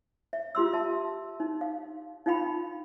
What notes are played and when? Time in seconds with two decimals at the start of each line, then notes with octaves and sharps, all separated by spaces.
0.33 E5
0.55 F4 G4 C6 E6
0.73 E5 A5
1.40 D#4
1.61 F5
2.26 D#4 F4 F5 G5 B5